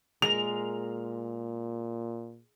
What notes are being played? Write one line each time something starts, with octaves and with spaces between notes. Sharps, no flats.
A#2 G#3 A#4 F7